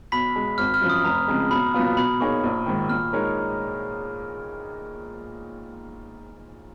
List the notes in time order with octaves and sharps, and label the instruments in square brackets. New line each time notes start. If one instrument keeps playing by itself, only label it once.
[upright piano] B1 [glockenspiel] B5 B6
[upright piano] B2 G#3
[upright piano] G#1 [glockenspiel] F6
[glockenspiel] F6
[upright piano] F#2 F3
[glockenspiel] D#6
[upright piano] F1 [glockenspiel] A#5
[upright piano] F2 C#3 G#3
[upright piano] B1 [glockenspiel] B5
[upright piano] A#2 F#3 B3 F4
[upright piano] B2 [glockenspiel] B5
[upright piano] A#3 D#4 G#4 C#5 [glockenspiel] C#6
[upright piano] A#1
G#2 D#3
[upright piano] A#2 [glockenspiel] F6
[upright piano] G#3 D#4 A#4 C#5